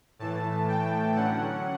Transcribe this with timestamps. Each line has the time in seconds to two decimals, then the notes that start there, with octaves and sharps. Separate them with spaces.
0.19 A2 E3 A3 A5
0.68 G5
1.16 D3 F#3 C#4 F#5